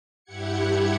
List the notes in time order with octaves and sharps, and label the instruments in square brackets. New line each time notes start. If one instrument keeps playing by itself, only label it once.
[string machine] G2 E4 G4 F#5 G#6 C#7